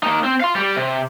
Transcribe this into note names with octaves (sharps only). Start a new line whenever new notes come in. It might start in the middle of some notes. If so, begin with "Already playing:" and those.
A#3 D#4
C4
F5 C6
G3 G4
C3